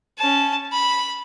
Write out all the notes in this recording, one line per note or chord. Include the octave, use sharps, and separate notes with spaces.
C#4 A5
B5